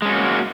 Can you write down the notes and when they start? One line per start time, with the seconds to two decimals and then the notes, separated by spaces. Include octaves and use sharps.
0.02 G#3
0.06 C#4
0.09 F#4
0.13 A#3